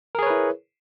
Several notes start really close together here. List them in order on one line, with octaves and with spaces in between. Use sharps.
A#4 G#4 C#5 B4 E4